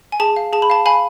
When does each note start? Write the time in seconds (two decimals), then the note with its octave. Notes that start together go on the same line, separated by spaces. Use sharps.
0.12 G#5
0.20 G#4 A5
0.36 F5
0.53 G#4 A5
0.62 B5
0.70 F5 A5
0.86 F5 G#5 B5